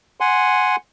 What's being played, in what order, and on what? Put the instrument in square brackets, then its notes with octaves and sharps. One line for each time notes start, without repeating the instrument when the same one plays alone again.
[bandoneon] F#5 G#5 C6